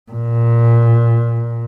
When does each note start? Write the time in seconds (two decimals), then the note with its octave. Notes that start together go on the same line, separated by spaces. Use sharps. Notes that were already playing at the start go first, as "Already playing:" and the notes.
0.12 A#2